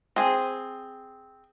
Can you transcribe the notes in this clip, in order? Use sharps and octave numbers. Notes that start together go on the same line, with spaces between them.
C4 G#4